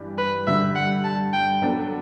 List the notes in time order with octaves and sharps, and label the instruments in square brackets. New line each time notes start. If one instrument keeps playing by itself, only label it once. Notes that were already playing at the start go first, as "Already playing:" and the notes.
Already playing: [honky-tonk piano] G2 E3 G3 D4 G4
[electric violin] B4
[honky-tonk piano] G2 D3 G3 [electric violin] E5
[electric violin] F#5
A5
G5
[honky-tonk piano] F#3 B3 D4 A4